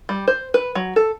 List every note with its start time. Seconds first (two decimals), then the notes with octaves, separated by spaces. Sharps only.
0.09 G3
0.28 C5
0.54 B4
0.75 F#3
0.96 A4